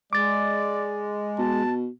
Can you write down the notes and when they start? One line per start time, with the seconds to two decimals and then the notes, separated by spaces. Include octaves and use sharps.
0.13 G#3 D5 D6 A6
1.39 B2 A5